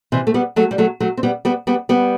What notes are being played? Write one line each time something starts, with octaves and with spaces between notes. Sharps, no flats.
C3 E3
A3
G3 B3
F#3 A3
G3
F#3 A3
F#3 A3
C4
G3 B3
G3 B3
G3 B3
G3 B3